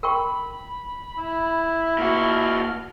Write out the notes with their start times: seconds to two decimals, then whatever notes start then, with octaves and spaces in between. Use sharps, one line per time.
0.03 A#4 G5 B5 C#6
1.18 E4
1.98 A#2 F#4 F6